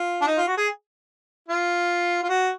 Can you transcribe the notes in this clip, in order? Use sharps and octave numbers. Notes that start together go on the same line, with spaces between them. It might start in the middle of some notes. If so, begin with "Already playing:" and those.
Already playing: F4
D4
D#4
F4
F#4
G#4
F4
F4
F#4